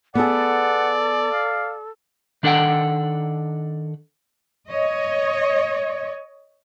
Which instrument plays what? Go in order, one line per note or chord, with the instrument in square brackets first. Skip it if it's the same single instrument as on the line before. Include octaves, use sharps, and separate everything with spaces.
[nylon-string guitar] B3 G#4 [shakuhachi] A4 [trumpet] D5 [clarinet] F#5
[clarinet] F5
[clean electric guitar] D#3 D4 A4 B4 F#5 G5
[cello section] C#5 D#5